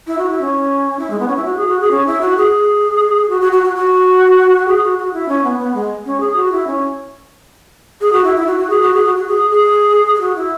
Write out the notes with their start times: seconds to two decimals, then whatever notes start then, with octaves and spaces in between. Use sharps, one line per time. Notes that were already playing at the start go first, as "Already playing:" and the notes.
0.07 E4
0.19 F#4
0.30 E4
0.41 C#4
0.99 E4
1.10 G#3
1.20 B3
1.28 C#4
1.36 E4
1.45 F#4
1.57 G#4
1.68 F#4
1.80 G#4
1.91 C#4
2.07 E4
2.21 F#4
2.37 G#4
3.29 F#4
3.41 F#4
3.52 F#4
3.63 F#4
3.75 F#4
4.68 G#4
4.83 F#4
4.99 F#4
5.13 E4
5.29 C#4
5.44 B3
5.59 B3
5.75 G#3
6.06 C#4
6.20 G#4
6.36 F#4
6.52 E4
6.67 C#4
8.01 G#4
8.13 F#4
8.24 E4
8.36 E4
8.47 F#4
8.58 F#4
8.70 G#4
8.82 F#4
8.94 G#4
9.05 F#4
9.16 F#4
9.28 G#4
9.51 G#4
10.15 G#4
10.20 F#4
10.36 E4